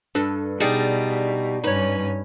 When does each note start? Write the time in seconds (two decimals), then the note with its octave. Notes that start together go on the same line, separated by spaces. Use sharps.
0.15 G2 D4 A4 B4
0.60 B2 G3 D4 D#4 G#4 D5
1.64 G2 C#4 D#4 B4 C#5